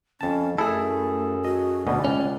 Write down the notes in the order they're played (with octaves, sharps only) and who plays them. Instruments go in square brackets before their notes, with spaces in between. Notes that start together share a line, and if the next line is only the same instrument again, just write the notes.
[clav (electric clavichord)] F2 A5 [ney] C#4
[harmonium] F#2 [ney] A3 [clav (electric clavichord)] E4 [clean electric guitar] G#4 A4
[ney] F#4 [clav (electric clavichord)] D#5
[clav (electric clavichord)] D2 B2 D#5 [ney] D5
[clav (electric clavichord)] C#2 [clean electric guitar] C#4